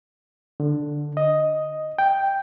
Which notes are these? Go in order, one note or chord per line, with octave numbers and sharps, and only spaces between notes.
D3
D#5
G5